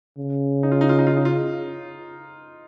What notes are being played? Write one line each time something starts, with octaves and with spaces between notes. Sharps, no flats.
C#3
D#4
F4
D#4
F4
D#4
F4
D#4
F4